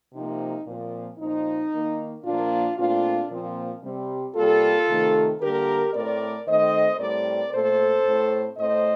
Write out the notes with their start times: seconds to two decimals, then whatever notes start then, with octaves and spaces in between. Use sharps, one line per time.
0.13 C3 F3 A#3 D#4
0.65 A#2 F3 C4
1.18 A#2 F3 C4 D#4
1.72 D#3 A#3
2.24 A#2 F3 A#3 D4 F4
2.76 A#2 A3 C4 D4 F4
3.29 A#2 F3 C4
3.83 C3 G3 C4
4.35 C3 G3 A#3 F4 A4
4.88 C3 D#3 A3 C4
5.40 D3 G3 A#3 G4 A#4
5.93 A2 A3 C4 A#4 D5
6.46 D#3 A3 C4 C5 D#5
6.99 A2 G3 C4 A#4 D5
7.52 A#2 A3 C4 A4 C5
8.05 A2 A3 C4
8.57 A2 A3 C4 C5 D#5